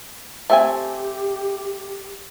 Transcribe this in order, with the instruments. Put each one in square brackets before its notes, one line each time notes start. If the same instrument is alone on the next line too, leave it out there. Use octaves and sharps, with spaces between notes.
[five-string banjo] A3 C4 G#5 [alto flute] G4